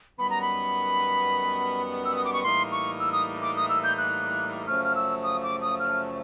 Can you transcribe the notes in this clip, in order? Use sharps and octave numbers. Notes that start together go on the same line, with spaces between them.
F#2 D#3 G3 B3 B5
A#5
B5
E6
D#6
D6
C#6
A2 E3 G3 A#3 D#4 C6
C#6
E6
D#6
D6
D#6
E6
G6
F#6
F#2 C#3 F3 A3 F6
F6
E6
D#6
D6
D#6
F6